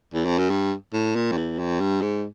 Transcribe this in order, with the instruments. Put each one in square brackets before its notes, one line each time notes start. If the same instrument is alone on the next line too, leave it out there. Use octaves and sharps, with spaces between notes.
[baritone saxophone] E2
F2
F#2
G2
A2
A#2
F2
E2
F2
G2
G#2